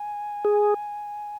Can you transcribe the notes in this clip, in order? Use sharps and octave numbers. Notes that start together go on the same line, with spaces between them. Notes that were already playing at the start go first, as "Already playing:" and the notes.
Already playing: G#5
G#4